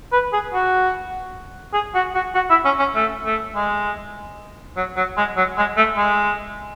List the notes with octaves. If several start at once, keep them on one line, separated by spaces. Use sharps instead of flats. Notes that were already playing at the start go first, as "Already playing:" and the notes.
B4
G#4
F#4
G#4
F#4
F#4
F#4
E4
C#4
C#4
A3
A3
G#3
F#3
F#3
G#3
F#3
G#3
A3
G#3